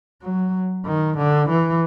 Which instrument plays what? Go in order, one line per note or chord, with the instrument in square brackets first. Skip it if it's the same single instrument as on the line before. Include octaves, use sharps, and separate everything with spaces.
[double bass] F#3
D#3
D3
E3